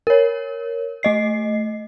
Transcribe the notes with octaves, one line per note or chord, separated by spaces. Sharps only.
A#4 C#5
A3 D#5 C7